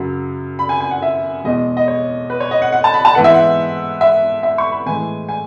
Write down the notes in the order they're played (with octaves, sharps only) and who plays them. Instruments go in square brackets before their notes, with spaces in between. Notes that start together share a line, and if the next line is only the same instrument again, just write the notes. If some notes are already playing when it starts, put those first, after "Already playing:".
Already playing: [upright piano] F#2 C#3 F#3
B5
G#5
G#5
F#5
E5
E2 B2 G#3 D#5
D#5
C#5
B4
C#5
D#5
F#5
F#5
A5
B5
A5
G#2 E3 B3 F#5
E5
F#5
E5
E5
C#6
B5
A2 E3 G#3 G#5
G#5